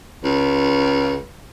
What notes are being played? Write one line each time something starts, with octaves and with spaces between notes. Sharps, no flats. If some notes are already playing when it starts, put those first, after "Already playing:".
C#2